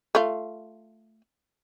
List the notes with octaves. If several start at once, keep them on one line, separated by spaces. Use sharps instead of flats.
A3 F4